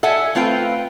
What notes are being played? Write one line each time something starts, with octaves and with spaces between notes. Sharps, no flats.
A4 E5 F#5 G#5
A3 C4 F4 B4 G5